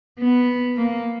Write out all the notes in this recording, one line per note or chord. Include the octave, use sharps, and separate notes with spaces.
B3
A#3